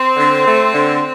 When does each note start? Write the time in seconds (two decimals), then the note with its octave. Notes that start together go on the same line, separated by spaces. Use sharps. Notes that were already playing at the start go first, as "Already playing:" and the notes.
Already playing: C4
0.16 D3
0.46 A3
0.73 D3